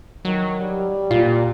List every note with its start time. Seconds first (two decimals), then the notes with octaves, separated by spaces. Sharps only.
0.25 D#3 F#3
0.60 G3
1.11 A#2 F4